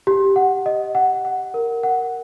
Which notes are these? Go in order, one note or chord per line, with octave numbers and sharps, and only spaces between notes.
G4
F#5
D#5
F#5
F#5
A#4
F#5